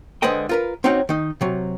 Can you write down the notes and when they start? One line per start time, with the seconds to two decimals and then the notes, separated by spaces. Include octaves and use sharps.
0.22 D3 G#3 B4 C5 D#5 G5
0.49 F4 A#4 B4
0.84 C4 C#4 D#4 F#4 C#5 G5
1.09 D#3 D#4
1.41 C3 F#3